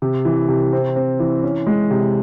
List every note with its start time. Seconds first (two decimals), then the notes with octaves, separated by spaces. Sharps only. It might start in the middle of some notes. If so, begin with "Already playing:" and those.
0.02 C3
0.25 E3
0.49 C3
0.73 C4
0.96 C4
1.20 E3
1.43 C#4
1.67 G#3
1.91 C3